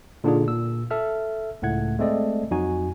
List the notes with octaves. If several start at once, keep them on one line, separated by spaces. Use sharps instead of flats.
A#2 D3 D4 D#4 F4 G#4
A#2 E6
A4 E5 F6
C#2 A2 A3 F#5 G#6
G#3 A3 C4 A4 D5 D#5
F2 F#3 D#4 F#4 G#5